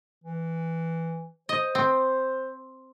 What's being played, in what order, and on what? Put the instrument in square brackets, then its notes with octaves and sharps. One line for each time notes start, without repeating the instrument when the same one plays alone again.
[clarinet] E3
[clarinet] C5 [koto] D#5
[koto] C4